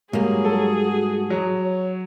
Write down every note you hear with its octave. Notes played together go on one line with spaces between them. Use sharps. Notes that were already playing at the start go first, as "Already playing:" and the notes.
G#2 F#3 G3 A#3 G#4
A4
F#4
F#3 F#4
C#5